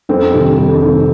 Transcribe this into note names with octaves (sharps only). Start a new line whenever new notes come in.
F2 C4
C3 D#3
F2
C3 D#3